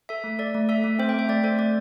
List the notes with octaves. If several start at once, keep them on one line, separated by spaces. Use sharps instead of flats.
A4 E5
A3
A4 D5
A3
A4 E5
A3
C4 C5
G5
A3 E5
A3 D5
A4 C5
A3 D5